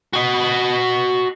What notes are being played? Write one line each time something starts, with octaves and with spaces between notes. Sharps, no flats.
F#4 D#5